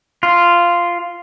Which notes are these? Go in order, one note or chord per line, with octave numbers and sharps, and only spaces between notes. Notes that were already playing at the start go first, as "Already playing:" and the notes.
F4